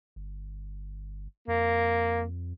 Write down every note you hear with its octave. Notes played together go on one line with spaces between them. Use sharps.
G1
F2 A#3